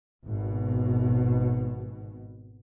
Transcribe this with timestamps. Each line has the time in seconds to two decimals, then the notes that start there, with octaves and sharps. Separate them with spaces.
0.25 G#1 B2